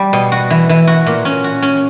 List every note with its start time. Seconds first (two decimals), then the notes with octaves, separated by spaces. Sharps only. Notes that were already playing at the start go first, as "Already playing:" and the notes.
Already playing: G3
0.13 B2
0.32 F#4
0.50 E3
0.69 E3
0.87 F#4
1.07 A#2
1.25 C#4
1.44 F#4
1.62 C#4